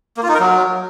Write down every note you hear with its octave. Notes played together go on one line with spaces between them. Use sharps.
A#3
F4
D#4
A#4
F#3